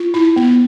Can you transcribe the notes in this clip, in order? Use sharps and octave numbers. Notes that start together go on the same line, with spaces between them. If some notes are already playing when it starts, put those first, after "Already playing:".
Already playing: F4
E4
B3